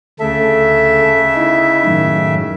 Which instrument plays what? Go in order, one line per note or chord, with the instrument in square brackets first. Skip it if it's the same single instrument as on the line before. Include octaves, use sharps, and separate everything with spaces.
[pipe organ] D2 A3 A4 [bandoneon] C#3 E5
[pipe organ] D#4 E4
F#2 A2 D#3